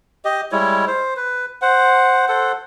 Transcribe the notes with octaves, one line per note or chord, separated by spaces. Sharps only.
G4 D#5
G3 G#3 E4 C#5
C5
B4
C5 F#5
A4 C5 F#5